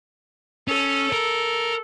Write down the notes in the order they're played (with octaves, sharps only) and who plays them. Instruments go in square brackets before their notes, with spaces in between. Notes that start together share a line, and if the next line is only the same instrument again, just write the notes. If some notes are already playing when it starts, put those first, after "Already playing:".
[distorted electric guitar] C#4 [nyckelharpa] A4
[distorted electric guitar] A#4